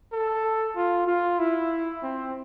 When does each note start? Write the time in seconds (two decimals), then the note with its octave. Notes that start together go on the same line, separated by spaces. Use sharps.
0.13 A4
0.76 F4
1.07 F4
1.39 E4
2.03 C4